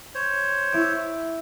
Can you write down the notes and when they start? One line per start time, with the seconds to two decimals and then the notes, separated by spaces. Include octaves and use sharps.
0.15 C5 C#5
0.73 E4 D6